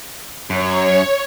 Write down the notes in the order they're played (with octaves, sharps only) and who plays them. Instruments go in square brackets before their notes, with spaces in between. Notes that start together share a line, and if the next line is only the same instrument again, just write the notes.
[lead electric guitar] F#2 [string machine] C#5